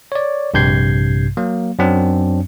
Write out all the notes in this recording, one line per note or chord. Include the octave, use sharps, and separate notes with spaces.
C#5 D5
A#1 G2 C3 G6 G#6 C7
F#3 A#3
F#2 F#3 C4 D4